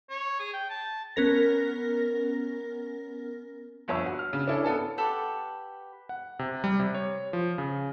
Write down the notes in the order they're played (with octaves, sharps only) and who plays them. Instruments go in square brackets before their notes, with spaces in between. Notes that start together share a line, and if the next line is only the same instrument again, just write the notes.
[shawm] C#5
G#4
G5
A5
[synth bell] B3 C#4 A#4 A#6
[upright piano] G1 F2 C#5 E6
F#4
F6
C#3
C#4 D4 E4 A4
B3 A4 A5
[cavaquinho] G4 A4 B4 F#5
[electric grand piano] F#5
C3
G3
C3
C#5
F3
C#3